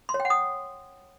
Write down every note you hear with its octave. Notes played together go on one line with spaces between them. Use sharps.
C6
C#5
G5
F#5
D#6